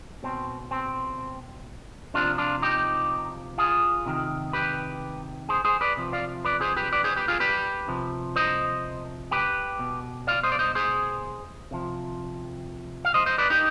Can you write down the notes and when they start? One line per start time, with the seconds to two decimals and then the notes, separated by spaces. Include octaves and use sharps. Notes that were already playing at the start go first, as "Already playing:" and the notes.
0.23 B2 C4
0.71 C4
2.14 C3 F3 D4 F4
2.38 D4 F4
2.62 D#4 G4
3.58 F4 G#4
4.06 C3 D#3
4.53 G4 B4
5.49 G#4 C5
5.65 G#4 C5
5.81 B4 D5
5.97 C3 F3
6.13 D5 F5
6.44 B4 D5
6.61 G#4 C5
6.76 G4 B4
6.92 B4 D5
7.04 G#4 C5
7.16 G4 B4
7.28 F4 G#4
7.40 G4 B4
7.88 C3 F3
8.36 C5 D#5
9.31 G4 B4
9.79 B2
10.27 D5 F5
10.43 C5 D#5
10.52 D5
10.59 C5 D#5
10.75 G#4 C5
11.71 C3 F3
13.05 F5
13.14 C5 D#5
13.26 C5 D#5
13.38 B4 D5
13.50 D#4 G4